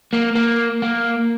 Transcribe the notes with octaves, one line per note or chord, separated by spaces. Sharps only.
A#3
A#3
A#3